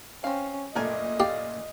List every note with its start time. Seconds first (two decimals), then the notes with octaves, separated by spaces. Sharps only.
0.24 C4 C#4 F5
0.75 F#1 A#2 A3 D4 A#4 D#5 G#5
1.20 G4 D5 F5